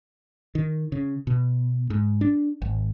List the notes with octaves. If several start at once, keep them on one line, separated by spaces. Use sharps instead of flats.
D#3
C#3
B2
G#2
D4
G#1